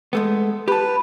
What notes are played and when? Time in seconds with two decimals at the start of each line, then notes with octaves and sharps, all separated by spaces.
0.13 G#3 A3 B3
0.68 G4 B4 A5